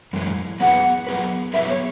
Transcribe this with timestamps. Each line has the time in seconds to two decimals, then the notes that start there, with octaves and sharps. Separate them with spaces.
0.13 F#2 E3 G#3 E4 G#4
0.60 F#3 B3 G#4 B4 F#5
1.07 F#3 B3 G#4 B4
1.53 F#3 B3 G#4 B4 E5
1.70 C#5